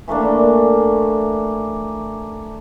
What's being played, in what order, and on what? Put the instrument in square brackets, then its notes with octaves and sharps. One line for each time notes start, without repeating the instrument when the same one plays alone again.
[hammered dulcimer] E3 A3 A#3 D4